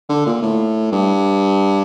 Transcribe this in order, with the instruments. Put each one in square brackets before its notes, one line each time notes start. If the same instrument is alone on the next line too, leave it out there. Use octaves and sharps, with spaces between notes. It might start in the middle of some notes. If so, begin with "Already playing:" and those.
[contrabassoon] D3
A#2
A2
G2